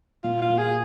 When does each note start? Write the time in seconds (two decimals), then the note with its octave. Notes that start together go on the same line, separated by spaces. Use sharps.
0.24 A#2 F4
0.42 F4
0.50 A#2
0.59 G#4